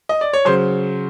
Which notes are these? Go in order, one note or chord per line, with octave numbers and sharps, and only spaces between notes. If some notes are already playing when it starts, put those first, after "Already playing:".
D#5
D5
C#5
C#3 F#3 C5